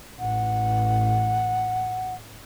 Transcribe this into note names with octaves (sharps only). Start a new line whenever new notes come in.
A1 F#5